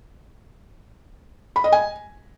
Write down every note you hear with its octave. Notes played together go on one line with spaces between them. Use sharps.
B5
D#5
G#5